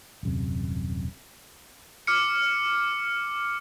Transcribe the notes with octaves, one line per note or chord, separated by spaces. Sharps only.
D#1 F#2 C3
D6 F6 C#7